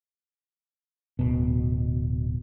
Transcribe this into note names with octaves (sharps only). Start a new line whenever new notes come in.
D1 B2